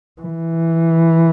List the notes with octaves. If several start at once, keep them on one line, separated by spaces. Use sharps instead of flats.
E3